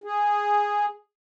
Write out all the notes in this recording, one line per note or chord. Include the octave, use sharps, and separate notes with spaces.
G#4